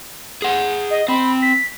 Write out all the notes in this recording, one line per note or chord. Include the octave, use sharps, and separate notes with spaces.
G#4 F#5
D#5
C4 B5
B6